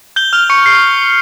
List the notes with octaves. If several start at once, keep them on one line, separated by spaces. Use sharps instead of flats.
G6 G7
F6 F7
C#6 C#7
C7